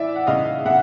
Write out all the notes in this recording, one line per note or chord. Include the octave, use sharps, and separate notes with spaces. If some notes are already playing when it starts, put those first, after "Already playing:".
Already playing: E3 D5 E5
F#5
C#3 D#5 F5
C#3 E5 F#5